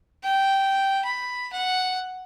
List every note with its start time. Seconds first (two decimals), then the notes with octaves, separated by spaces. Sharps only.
0.24 G5
1.05 B5
1.53 F#5